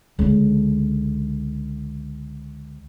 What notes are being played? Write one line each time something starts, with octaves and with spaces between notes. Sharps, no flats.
C#2 D3